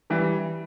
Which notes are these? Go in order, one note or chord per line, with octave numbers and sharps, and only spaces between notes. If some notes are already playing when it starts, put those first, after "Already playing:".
E3 G3